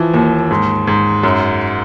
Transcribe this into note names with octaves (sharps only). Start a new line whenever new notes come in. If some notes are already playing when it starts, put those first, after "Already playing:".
Already playing: E3 F3
D#2
G#2
G#2
F#2